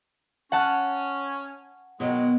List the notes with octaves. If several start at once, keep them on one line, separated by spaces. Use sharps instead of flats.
C#4 F#5 A5 F#6
B2 D#3 F#3 G#3